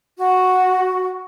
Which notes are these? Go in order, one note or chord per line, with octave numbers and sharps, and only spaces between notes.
F#4